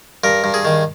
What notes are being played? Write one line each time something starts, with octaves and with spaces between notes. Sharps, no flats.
G2 A#4
G2
G#4
D#3